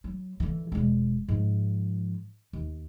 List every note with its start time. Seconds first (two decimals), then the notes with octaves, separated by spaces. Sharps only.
0.04 F#3
0.40 D3 E3
0.72 E1 G#3
1.28 G#2 F3
2.53 D#2